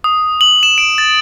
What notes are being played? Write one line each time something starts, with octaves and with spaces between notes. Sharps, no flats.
D#6
F#7
E7
D7
A6